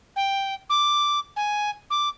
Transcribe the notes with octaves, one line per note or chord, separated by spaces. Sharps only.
G5
D6
G#5
D6